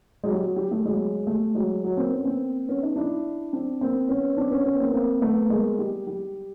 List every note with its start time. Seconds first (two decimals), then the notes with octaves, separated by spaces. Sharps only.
0.24 F#3 G#3
0.33 G3
0.43 F#3
0.56 G3
0.71 G3 A3
0.86 F#3 G#3
1.27 G3 A3
1.55 F#3 G#3
1.84 F#3
1.97 A#3 C4
2.12 B3 C#4
2.25 A#3 C4
2.68 B3 C#4
2.82 C#4 D#4
2.96 D4 E4
3.53 C4 D4
3.81 A#3 C4
4.09 B3 C#4
4.37 C4 D4
4.51 B3 C#4
4.65 B3 C#4
4.80 A#3 C4
4.94 A#3 C4
5.22 A3 B3
5.50 G#3 A#3
5.79 G3
6.07 G3